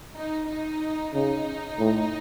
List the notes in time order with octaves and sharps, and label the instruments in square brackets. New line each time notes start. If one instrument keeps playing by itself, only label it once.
[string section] D#4
D#4
[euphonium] C#3 [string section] D#4
[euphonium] A2